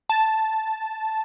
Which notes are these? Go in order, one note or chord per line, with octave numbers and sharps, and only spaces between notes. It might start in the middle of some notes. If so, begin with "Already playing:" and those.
A5